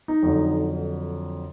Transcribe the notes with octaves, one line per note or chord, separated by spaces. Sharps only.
D#4
F2 D3 F#3